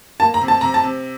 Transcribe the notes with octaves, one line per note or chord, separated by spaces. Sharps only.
A#3 A5
A#5
C3
A5
C3 A#5
A5
C3